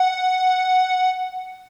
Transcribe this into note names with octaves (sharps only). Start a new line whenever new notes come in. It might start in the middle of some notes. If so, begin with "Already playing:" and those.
Already playing: F#5